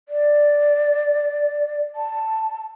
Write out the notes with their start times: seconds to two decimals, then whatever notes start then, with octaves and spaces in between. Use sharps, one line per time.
0.09 D5
1.95 A5